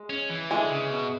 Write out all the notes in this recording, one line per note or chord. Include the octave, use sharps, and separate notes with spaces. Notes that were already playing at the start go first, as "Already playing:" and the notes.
Already playing: G#3
C#4
E3
D3 E3 G#3
C#3
B2